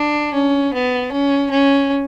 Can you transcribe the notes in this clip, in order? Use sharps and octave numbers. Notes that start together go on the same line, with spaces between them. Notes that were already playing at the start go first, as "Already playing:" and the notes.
Already playing: D4
C#4
B3
C#4
C#4